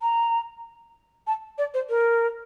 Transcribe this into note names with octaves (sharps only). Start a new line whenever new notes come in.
A#5
A5
D5
C5
A#4